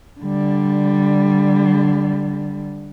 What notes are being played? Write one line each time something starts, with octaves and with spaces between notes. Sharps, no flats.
D3 G3